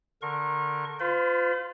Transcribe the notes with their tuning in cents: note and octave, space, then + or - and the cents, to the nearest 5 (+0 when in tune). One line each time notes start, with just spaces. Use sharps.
D3 +0 A#4 +0 C#6 -35
F4 +0 C5 -40 B5 +40